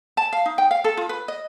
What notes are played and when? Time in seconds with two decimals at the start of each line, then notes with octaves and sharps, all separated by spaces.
0.17 A5
0.33 F5
0.46 D#4
0.58 G5
0.71 F5
0.84 A4
0.97 F4
1.09 B4
1.28 D#5